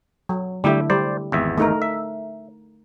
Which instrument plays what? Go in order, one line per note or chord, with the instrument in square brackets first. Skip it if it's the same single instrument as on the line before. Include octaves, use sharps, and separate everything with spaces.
[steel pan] F#3
[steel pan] D3 A3 E4 [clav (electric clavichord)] G3 G4
[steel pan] G3 [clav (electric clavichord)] C5 D5
[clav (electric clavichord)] G#1 E2 E5
[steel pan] A3 D#4 A#4
[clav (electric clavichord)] E5